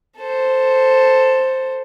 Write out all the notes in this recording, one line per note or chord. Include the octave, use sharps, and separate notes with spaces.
A4 C5